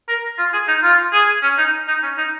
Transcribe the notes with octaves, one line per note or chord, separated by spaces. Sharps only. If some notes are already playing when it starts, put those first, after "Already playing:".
A#4
F4
G#4
D#4
F4
G#4
C#4
D#4
D#4
C#4
D#4